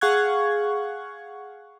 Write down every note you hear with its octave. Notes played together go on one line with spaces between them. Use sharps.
G#4 F5 F#5 C#6 F#6 G#6